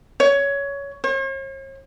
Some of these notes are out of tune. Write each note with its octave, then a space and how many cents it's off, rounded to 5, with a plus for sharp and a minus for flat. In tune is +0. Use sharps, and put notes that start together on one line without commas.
C#5 +15
C#5 -45